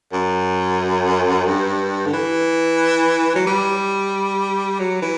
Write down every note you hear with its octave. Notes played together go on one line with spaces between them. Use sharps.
F#2
G2
D3
E3
F#3
G3
F#3
E3